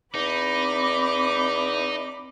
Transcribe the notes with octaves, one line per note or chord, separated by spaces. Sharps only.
E2 C4 D#4 B5 D6